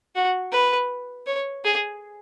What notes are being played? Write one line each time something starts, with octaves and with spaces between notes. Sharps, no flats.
F#4
B4
C#5
G#4